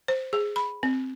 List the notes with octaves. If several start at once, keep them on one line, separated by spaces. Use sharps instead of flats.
C5
G#4
B5
C4